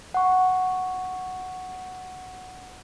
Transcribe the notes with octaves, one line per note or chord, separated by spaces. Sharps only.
F#5 C#6